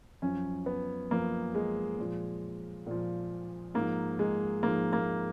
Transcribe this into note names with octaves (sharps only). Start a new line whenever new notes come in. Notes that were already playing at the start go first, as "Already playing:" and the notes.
F#2 F3 C#4
B3
F#2 F3 A#3
G#3
A#2 F3
A#2 F3
G#2 F3 A#3
G#3
G#2 F3 A#3
A#3